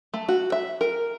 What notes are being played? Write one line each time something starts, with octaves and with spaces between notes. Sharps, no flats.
A3
F#4
E5
A#4